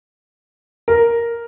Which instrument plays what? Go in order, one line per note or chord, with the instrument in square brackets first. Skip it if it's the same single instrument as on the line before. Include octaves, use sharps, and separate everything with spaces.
[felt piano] A#4